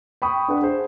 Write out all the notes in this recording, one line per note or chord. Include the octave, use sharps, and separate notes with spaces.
G5 B5 C#6 D#6
D4 B4 F#5
G#4 C5